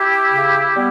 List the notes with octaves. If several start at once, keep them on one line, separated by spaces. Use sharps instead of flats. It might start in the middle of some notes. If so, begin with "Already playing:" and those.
Already playing: E4 G4
C#3
G3 B3